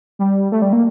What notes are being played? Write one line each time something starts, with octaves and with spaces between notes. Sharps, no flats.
G3
A3
G3
A#3